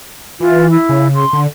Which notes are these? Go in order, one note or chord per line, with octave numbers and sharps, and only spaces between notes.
E3 F4
E4
C#3
C6
D3